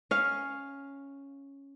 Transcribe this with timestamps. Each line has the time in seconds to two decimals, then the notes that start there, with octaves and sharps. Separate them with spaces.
0.11 C#4 F5